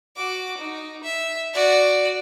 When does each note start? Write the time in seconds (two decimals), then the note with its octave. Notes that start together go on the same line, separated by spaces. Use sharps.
0.16 F#4 D6
0.58 D#4
1.03 E5
1.54 F#4 D5